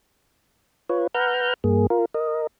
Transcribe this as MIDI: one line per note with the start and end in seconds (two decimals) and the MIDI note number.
0.89 1.07 65
0.89 1.07 71
0.89 1.07 73
1.14 1.54 71
1.14 1.54 78
1.14 1.54 82
1.14 1.54 89
1.14 1.54 91
1.64 1.87 43
1.64 1.87 58
1.64 1.87 68
1.90 2.05 65
1.90 2.05 70
2.14 2.47 70
2.14 2.47 75